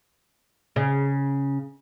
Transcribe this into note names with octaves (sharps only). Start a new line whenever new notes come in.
C#3